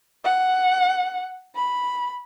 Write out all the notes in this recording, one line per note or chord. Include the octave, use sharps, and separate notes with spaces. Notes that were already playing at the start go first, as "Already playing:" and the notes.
F#5
B5